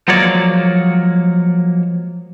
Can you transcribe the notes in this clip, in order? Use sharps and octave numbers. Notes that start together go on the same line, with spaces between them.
F3 F#3 G#3 A#3 C#5 D5